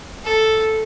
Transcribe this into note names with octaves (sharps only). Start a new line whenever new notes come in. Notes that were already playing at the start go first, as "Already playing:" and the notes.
A4